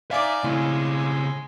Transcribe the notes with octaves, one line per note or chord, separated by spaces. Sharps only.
D#4 D5 E5 F5 G#5 D6
A2 C#3 G#3 C4